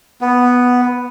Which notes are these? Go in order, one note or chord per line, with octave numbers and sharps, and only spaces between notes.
B3